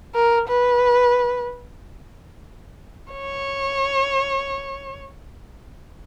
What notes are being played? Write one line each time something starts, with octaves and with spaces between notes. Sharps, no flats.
A#4
B4
C#5